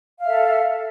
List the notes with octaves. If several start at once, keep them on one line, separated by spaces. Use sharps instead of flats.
A4 E5 F5